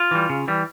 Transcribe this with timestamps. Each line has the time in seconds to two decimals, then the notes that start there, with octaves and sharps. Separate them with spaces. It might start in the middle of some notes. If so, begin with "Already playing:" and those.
Already playing: F4
0.11 E3 G3
0.30 C#3
0.48 E3 G3